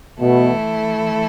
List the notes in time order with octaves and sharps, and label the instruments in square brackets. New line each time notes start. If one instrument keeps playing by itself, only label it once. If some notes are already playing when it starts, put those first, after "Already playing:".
[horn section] B2 [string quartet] E3 A3 E4 A4